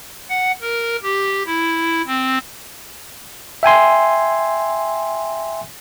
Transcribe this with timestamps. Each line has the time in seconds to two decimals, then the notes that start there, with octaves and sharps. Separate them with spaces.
0.29 F#5
0.61 A#4
1.03 G4
1.47 E4
2.07 C4
3.63 E5 G5 G#5 C6